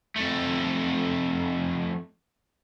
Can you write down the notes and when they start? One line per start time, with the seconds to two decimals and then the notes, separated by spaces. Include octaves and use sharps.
0.16 F2 A3